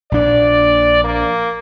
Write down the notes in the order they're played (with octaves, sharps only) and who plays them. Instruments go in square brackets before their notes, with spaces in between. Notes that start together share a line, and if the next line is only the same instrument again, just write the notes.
[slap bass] A#1 D4 [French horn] D5
[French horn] A#3